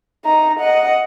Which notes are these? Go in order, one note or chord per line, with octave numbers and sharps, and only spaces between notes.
D#4 A#5
D#5 F#5